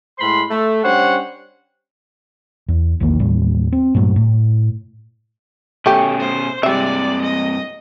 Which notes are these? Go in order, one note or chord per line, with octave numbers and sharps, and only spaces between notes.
A2 G#3 B5 C6
A3
G3 C#4 D4 C5 C#5 F#5
E2
A#1 E2 D#3 A#3
D#2 A2 G3
C4
G2 A#2 F#3 A3
A2
B2 A3 C#4 G4
C5
G2 C3 G3 G#3 D5 E5
D#5